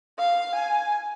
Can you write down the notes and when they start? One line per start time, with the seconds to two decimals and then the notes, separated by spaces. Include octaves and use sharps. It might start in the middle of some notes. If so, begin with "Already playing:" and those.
0.19 F5
0.55 G#5